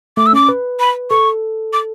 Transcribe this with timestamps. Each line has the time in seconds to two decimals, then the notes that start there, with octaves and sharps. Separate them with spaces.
0.17 A3 D6
0.26 E6
0.33 C#4 D6
0.49 B4
0.80 B5
1.10 A4 C#6
1.73 D6